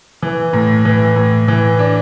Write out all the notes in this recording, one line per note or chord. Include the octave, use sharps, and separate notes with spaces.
E3
A2
E3
A2
E3
D4